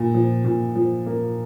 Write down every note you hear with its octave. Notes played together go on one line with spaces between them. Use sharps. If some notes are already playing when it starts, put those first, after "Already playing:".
Already playing: A#2
F3
A#2
F3
A#3